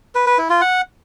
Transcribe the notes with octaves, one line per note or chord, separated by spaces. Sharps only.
B4
B4
E4
F4
F#5